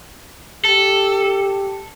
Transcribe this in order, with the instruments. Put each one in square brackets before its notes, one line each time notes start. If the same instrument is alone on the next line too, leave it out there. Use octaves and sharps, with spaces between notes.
[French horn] G4 [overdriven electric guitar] A4